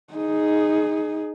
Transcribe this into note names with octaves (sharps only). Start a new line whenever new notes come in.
D#4 G#4